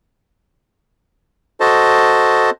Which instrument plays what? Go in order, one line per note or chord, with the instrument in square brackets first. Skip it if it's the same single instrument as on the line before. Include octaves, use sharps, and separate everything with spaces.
[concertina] F#4 A4 C5 D#5 A5